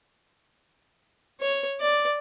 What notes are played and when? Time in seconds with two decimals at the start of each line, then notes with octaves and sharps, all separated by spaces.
1.41 C#5
1.80 D5